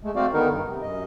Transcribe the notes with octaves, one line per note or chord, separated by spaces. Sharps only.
G#3 A3
A3 C4 F#4 D5 F5
D3 D#3 B3 D#4 A#4
G2
C3
F#2 D#5